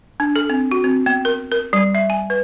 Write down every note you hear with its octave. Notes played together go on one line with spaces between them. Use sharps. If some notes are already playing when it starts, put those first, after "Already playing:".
D4
A4
C4
F#4
C4
B3
A#4
A#4
G3
E5
G#5
B4